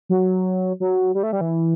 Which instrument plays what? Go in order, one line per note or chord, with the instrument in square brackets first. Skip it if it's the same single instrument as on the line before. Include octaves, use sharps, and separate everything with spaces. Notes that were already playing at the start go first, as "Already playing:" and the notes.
[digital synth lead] F#3
F#3
G3
A3
G3
E3